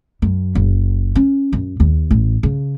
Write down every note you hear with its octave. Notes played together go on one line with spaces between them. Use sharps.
F#2
F#1
C#4
F#2
D#2
A1
C#3